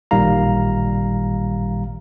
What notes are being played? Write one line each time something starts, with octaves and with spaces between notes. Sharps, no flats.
A1 A#2 D#3 G3 F5 A#5